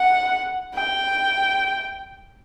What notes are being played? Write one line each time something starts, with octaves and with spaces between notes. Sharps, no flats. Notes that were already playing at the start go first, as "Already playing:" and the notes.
Already playing: F#5
G5